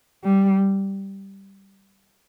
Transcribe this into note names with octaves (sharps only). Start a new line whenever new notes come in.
G3